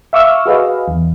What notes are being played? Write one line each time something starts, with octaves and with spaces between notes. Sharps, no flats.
E5 F5 C#6 D6 E6 F6
F#4 G#4 B4 D#5 F5
E2